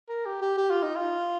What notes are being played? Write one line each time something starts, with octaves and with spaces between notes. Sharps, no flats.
A#4
G4
G4
G4
F4
D#4
F4